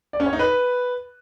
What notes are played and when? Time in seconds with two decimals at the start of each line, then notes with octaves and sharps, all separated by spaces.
0.13 D5
0.20 C#4
0.26 C#5
0.33 D#4
0.39 B4